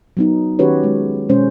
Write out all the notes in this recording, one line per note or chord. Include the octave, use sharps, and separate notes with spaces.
F#3 B3 D#4
D#3 C#4 F#4 G4 B4 C#5
G#3
B2 G#3 C#4 C5